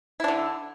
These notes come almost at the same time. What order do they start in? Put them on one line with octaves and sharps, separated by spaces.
E4 D4 D3